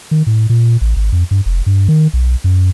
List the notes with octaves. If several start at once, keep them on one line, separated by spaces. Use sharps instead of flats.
D#3
A2
A#2
A1
G#1
F2
G2
F1
G2
D#3
B1
F#2